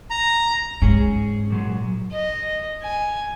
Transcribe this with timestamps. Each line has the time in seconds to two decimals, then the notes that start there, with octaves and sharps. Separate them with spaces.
0.10 A#5
0.82 G#2 C#4 G#4
1.50 A#2 F#3 G#3
2.12 D#5
2.82 G#5